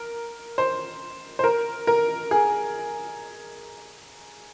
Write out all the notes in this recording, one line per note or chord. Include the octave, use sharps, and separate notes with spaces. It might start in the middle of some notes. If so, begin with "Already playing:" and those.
Already playing: A#4
C5
C5
A#4
A#4
G#4